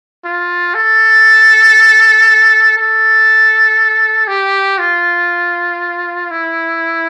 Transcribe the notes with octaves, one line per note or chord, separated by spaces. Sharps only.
F4
A4
A4
G4
F4
E4